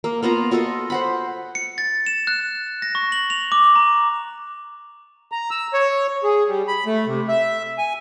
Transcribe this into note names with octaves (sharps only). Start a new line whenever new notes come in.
A#3
A#3 B3 F4 A#5
F4 F#4 A4 D#5
C5 F#5 B5
C#7
A6
E7
F#6
A#6
C#6
F#7
F7
D6
A#5
A#5
E6
C#5
G#4
G3
B5
A3
C3
E5
G#5